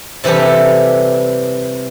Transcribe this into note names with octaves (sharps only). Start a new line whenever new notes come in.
C3 E3 G3 G4 A4